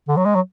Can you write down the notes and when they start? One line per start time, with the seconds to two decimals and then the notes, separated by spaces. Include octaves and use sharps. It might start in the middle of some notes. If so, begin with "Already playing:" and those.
0.08 D3
0.17 F#3
0.26 G#3
0.35 F#3